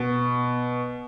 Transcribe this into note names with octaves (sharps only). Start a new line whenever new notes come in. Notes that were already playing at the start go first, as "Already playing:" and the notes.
Already playing: B2